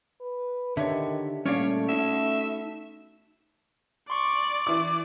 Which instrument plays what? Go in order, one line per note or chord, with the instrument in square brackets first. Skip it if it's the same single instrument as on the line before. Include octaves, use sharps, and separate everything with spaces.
[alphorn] B4
[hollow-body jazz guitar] D3 C#5 [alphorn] D#3 [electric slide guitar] G4 E5
[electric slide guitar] A#2 G3 [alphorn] A3 [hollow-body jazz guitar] C#4 D5 F5 [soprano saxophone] C#5
[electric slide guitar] D#4 F#4 [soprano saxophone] E5
[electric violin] D5 [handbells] C6 C#6
[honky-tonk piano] E3 D6